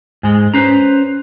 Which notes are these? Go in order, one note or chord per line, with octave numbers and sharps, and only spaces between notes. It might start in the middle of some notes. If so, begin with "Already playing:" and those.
G#2 G#3 G#5
C#4 B4 C5 A#5